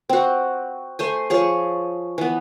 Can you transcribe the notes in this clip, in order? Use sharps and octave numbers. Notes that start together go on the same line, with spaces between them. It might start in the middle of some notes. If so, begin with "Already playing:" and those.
C4 F#4
A3 C5 G#5
F3 G#4 C#5
E3 B3